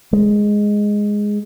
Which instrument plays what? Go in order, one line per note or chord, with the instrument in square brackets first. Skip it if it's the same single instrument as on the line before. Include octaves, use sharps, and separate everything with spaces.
[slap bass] G#3